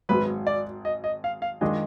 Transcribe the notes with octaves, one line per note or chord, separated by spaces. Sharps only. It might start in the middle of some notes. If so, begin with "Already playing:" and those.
G#1 G#2 F#3 B4
D5
D#5
D#5
F5
F5
D#3 G#3 D4 F4 D#5